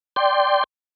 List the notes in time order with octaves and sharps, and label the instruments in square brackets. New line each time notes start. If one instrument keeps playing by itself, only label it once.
[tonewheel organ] D5 G5 C6